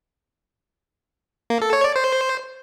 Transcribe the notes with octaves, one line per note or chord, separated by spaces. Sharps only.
A#3
A4
C#5
D5
C5